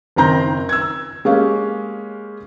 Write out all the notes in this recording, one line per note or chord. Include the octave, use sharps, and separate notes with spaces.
F#1 D#3 C4 A#5 C6 G6
E6 G#6
G#3 A#3 C#4 G4 F5